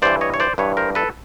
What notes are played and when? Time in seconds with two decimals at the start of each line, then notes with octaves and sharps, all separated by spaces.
0.02 G2 E3 C5 D5
0.21 C#5 D#5
0.34 C#5
0.40 C5 D5
0.58 G2 E3 B4 C#5
0.77 A#4 C5
0.95 A4 B4